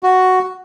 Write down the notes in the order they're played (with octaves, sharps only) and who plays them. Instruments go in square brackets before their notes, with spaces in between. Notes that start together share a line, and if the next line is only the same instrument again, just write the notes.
[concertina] F#4